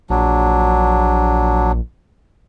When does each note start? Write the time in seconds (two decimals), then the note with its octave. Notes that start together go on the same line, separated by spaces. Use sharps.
0.10 A#1 F#3 D4